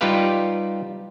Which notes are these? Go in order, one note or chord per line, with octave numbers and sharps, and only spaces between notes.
G3 D#4 F4 G4 B4 F5